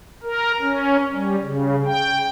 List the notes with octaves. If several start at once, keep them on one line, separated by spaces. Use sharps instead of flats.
A#4
C#4
G3
C#3
G5